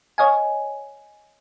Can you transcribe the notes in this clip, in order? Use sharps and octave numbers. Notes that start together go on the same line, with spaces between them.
C#5 D#5 F5 G#5